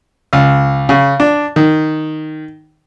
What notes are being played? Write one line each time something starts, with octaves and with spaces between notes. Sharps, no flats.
C#2
C#3
D4
D#3